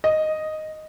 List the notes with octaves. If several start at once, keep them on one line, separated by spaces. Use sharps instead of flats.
D#5